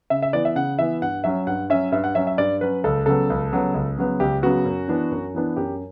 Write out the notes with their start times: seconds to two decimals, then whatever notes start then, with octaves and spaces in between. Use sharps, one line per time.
0.10 C#3 E5
0.22 E5
0.33 E3 B3 D5
0.45 E5
0.55 C#3 F#5
0.78 E3 B3 E5
1.02 G2 F#5
1.24 F#3 C#4 E5
1.47 G2 F#5
1.70 F#3 C#4 E5
1.92 G2 E5
2.04 F#5
2.15 F#3 C#4 E5
2.27 E5
2.38 G2 D5
2.61 F#3 C#4 B4
2.84 C#2 A4
3.06 C#3 F#3 B3 A4
3.30 C#2
3.52 C#3 F#3 B3
3.74 C#2
3.98 C#3 F#3 B3
4.20 C#2 G4
4.42 C#3 F#3 B3 F#4
4.65 F#2
4.88 E3 B3 D4
5.12 F#2
5.34 E3 B3 D4
5.57 F#2 G4